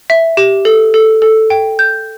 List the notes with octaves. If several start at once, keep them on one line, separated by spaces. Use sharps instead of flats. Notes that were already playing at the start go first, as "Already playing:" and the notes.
E5
G4
A4
A4
A4
G5
G6